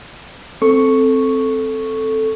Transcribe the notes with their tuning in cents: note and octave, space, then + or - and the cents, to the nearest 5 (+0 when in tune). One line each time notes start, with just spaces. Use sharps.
C4 +0 A4 +0 C#6 +0